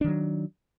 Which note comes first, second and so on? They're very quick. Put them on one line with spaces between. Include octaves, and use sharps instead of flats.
D4 D#3 F#3